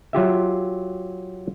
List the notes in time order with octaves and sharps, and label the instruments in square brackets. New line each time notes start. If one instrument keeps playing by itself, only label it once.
[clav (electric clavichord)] F#3 F4 G4 E5